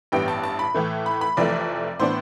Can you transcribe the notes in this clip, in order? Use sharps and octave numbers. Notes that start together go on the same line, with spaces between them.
A1 G2 E3 G3 B3 G5
A5
A5
B5
A2 E3 A3
B5
B5
F1 F2 E3 A3 D5
A2 E3 B3 D4 C5